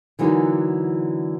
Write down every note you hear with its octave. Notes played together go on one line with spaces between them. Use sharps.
D3 E3 F#3 A#3 D#4